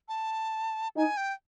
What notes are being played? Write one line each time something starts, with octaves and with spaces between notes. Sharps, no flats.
A5
D#4 G#5
G5